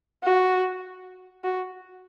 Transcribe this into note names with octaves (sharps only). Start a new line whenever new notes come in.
F#4
F#4